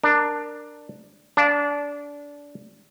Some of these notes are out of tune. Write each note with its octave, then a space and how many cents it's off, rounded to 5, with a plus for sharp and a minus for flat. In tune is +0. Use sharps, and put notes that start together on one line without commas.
D4 +10 A#4 +0
D4 -20 F5 +0